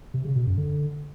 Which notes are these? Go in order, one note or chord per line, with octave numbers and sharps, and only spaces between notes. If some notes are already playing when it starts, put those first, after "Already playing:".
C3
C#3
B2
F#2
D3